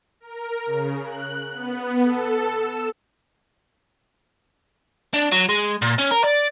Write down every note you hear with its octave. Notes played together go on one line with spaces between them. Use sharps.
A#4
C#3
F#6
B3
A4
E6
D4
F#3
G#3
A#2
C#4
A#4
D5